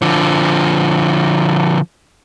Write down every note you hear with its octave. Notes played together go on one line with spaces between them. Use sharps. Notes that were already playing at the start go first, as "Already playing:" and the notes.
D3 F3